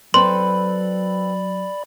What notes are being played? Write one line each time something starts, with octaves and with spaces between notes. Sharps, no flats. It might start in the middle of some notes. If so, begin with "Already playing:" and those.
F#3 C4 A4 B4 D5 B5 C6